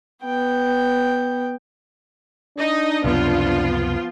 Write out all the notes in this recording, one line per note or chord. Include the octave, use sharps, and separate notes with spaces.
B3 G5
D4 D#4 D#5
C#2 F#2 C3 F3 B3 F4